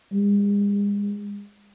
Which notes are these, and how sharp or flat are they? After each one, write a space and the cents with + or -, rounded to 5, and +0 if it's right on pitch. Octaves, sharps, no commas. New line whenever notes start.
G#3 -40